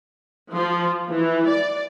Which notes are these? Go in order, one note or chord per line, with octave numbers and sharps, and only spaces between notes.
F3
E3
D5